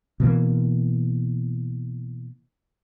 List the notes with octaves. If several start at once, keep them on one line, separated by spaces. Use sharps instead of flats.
B2 E3 A#3